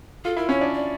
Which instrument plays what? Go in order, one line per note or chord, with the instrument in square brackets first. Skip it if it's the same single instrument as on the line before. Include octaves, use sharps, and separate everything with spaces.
[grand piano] F4 [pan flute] A4
[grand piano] E4 [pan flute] A#4
[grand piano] C#4 [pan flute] C#5
[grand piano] D4
[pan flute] D5